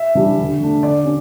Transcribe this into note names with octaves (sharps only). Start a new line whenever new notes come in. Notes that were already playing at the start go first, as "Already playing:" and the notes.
Already playing: E5
C#3 E3 G3 D4
D3
A3 D4
D3 D5
C#4